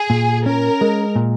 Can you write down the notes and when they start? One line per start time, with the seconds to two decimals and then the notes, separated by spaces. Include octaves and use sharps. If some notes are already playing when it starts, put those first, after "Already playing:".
Already playing: G#4
0.10 A#2
0.46 C#4 A#4
0.81 G#3
1.16 A#2